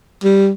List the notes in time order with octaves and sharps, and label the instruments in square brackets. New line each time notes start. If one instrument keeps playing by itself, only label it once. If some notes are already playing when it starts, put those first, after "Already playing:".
[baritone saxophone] G3